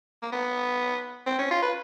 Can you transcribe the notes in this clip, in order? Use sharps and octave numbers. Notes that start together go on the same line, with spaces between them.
A#3
B3
C4
C#4
F4
B4